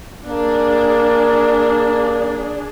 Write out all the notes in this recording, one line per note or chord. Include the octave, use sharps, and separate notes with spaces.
A#3 D4 G#4